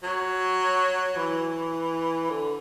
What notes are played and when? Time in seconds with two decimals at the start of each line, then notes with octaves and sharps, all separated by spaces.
0.03 F#3
1.16 E3
2.30 D3